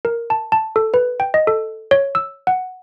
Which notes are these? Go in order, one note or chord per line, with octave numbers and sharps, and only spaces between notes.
A#4
A5
A5
A4
B4
G5
D#5
A4
C#5
E6
F#5